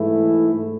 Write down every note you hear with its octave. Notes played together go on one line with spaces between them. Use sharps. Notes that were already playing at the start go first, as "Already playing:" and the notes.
Already playing: G#2 E3 A3 E4